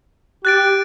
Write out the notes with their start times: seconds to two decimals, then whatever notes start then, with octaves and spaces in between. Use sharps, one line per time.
0.45 G4 F#6 A6 D7